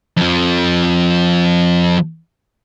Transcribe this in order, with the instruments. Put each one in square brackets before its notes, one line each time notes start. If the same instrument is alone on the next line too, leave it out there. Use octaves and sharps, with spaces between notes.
[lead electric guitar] F2 F3